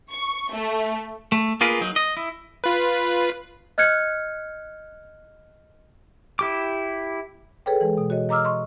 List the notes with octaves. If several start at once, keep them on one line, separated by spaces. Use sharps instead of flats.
C#6
A3
A3
A#3 F4 G#4 A#4 B4
F#3 D#4
D#5
E4
F4 B4
D#5 F6 F#6 G#6 C#7
E4 G4 D6
G#4 A4 B4 C#5 G5
E3 G#3
B2
F#4 C#5 D#5
D#5 A#5 D6 E6 F6
D#5 C6 C#6